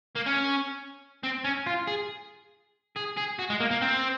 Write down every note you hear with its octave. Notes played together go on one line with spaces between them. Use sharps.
A#3
C#4
C4
C#4
F4
G#4
G#4
G#4
F#4
G#3
A#3
A#3
C4